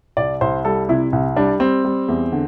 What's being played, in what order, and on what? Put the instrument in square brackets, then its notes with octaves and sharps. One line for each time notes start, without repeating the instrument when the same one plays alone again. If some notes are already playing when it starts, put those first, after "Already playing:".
[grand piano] C2 D5
C2 C5
G3 A4
C3 E4
C2
G3 D4
G3 C4
G3
E2
D3